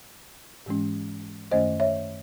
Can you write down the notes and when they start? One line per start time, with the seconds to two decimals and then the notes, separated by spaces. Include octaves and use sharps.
0.66 G#2 E3 G#3 C#4
1.51 F#2 D#3 A3 C#4 C5 D#5
1.80 C#5 E5